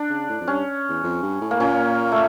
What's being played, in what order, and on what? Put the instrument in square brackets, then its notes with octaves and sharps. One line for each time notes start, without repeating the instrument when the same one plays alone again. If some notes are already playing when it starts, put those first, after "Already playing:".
Already playing: [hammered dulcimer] D4
[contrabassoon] C#3
A2
F2
[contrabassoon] G2 [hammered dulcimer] C#4
[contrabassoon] E2
F2
G2
A2
[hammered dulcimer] A#3
[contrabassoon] A#2 [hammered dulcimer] C#4
[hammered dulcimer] A3